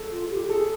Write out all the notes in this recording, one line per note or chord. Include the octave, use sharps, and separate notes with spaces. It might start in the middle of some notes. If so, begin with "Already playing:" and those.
Already playing: G#4 A4
F4
G4
G#4 A4